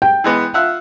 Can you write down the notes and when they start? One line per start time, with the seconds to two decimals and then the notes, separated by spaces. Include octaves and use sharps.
0.02 G5
0.24 E3 G#3 B3
0.54 F4 E5 F#5